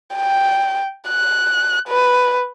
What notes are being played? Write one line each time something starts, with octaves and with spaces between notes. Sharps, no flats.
G5
F#6
B4